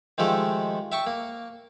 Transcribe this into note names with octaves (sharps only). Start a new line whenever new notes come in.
D#3 F3 G#3 A3 G4 A4
E5 G5 A5 C#6
A#3